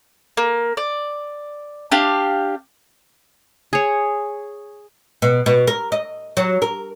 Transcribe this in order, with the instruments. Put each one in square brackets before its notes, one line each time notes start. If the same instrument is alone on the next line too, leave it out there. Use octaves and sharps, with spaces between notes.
[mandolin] A#3
D5
D4 G4 F5
[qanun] G#4 C#5
[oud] B2
B2
A#4
D#5
F#3
A#4